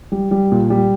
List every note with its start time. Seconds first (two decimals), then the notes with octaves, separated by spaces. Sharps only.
0.12 G3
0.31 G3
0.52 A#2
0.70 G3